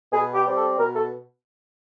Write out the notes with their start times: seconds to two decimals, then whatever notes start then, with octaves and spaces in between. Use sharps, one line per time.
0.12 B2 G#4
0.34 G4
0.45 G3 C4
0.56 A4
0.78 B2 A#4
0.95 A4